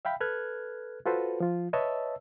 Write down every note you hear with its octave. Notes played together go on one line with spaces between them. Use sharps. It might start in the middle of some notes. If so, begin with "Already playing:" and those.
E5 F5 G5 B5
A4 B4 F6 F#6 G#6
F4 F#4 A4 B4 C5
F3 F4
B4 C#5 D#5 E5 A5 E6